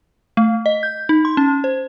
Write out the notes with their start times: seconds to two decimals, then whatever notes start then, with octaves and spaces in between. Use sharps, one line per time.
0.37 A3
0.66 D#5
0.83 G6
1.09 D#4
1.25 C6
1.37 C#4
1.64 C5